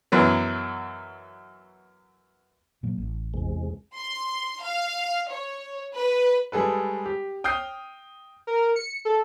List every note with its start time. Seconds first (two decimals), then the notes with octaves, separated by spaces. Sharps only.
0.12 F#2 B2 E3 F#3
2.83 A#2 F#3 A#3
2.98 A1
3.34 E2 C3 G#3
3.96 C6
4.62 F5
5.30 C#5
5.94 B4
6.52 G3 G#3 G#4 A4 B4
7.06 G4
7.44 G5 D#6 F6 G6 C7
8.47 A#4
8.76 C#7
9.05 A4